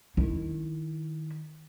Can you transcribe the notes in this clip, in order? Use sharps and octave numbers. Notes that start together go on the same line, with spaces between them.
D#3 E4